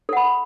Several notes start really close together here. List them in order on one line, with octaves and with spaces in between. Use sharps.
A4 F#5 B5